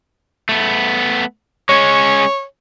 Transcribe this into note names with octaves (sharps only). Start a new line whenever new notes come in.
A3 B3
G#3 C#4 C#5